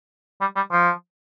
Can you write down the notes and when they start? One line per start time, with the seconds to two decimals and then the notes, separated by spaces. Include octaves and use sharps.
0.41 G3
0.56 G3
0.72 F3